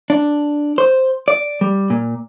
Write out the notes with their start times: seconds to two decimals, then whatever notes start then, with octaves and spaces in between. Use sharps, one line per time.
0.10 D4
0.78 C5
1.28 D5
1.61 G3
1.90 A#2